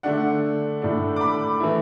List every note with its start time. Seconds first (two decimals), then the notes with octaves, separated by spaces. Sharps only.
0.03 D3 A3 D4 F#5
0.82 A2 A3 D4
1.16 D6
1.21 B5
1.60 E3 A3 E4